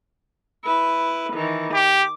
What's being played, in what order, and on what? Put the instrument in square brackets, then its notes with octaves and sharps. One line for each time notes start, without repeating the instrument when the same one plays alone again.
[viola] E4 B4
D#3 E3
[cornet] G4 [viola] D6